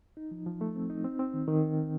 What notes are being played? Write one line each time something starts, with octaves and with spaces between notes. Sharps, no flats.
D#4
F3
F3
A3
C4
D#4
C4
C4
D#3
D#3